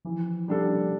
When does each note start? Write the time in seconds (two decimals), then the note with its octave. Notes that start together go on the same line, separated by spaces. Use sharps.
0.05 E3 F3
0.48 G3 D4 A4